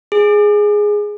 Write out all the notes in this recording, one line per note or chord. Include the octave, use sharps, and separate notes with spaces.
G#4